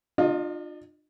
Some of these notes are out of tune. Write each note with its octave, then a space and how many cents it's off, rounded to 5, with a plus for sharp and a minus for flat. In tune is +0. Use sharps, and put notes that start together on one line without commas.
D4 +45 F4 +20 D#5 +0